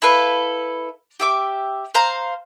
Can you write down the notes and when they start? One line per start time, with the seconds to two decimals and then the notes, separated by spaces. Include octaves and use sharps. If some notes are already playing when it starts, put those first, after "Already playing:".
0.02 E4 A4 B4 F5
1.20 G4 E5 D6
1.94 C5 F5 A#5